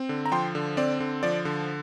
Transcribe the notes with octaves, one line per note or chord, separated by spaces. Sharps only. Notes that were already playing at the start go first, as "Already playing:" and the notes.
Already playing: C4
D3
A#5
F3 G5 C6
D3
C4 D5
D3
F3 D5
D3